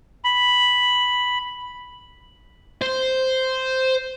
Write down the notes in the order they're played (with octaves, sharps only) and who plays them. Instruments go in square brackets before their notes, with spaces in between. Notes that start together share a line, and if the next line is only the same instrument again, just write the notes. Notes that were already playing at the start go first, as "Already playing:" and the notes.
[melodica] B5
[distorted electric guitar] C5